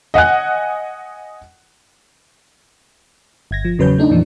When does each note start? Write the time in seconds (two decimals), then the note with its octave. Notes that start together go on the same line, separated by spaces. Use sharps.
0.14 D#5 F#5 G#5 F#6
3.51 G1 G#6 A#6
3.65 F3
3.79 E2 C#3 F#3 B4 C#5 G6
3.98 A3 D4 D#4
4.11 F2 A#2 E3 F3 D4